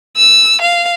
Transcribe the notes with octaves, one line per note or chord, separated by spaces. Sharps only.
E6
F5